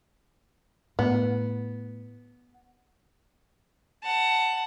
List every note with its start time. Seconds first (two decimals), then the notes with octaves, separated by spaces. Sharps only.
0.99 A2 B3
4.03 F#5 A5